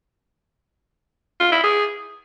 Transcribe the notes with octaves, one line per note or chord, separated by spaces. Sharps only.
F4
E4
G#4